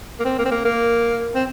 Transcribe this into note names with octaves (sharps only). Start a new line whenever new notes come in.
A#3
C4
A#3
C4
A#3
A#3
C4